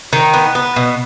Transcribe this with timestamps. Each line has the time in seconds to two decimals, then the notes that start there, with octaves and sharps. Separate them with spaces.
0.13 D#3
0.34 B3
0.55 B3
0.76 B2